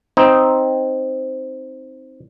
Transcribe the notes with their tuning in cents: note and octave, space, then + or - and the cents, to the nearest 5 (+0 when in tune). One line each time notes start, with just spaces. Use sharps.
C4 +0 D#4 +0